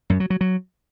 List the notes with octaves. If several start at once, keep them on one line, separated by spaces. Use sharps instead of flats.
F#2
F#3
F#3
F#3